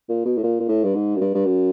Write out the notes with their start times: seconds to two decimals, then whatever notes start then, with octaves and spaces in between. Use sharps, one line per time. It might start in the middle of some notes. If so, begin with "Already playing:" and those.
0.09 A#2
0.25 B2
0.37 A2
0.43 A#2
0.60 A#2
0.69 A2
0.84 G2
0.95 G#2
1.16 F#2
1.21 G2
1.35 G2
1.46 F#2